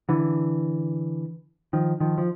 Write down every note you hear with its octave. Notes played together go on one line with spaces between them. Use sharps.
D3 E3
D#3 F3
D#3 F3
F3